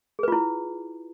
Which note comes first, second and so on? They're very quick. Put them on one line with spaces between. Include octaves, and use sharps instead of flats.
G#4 B4 F4 E4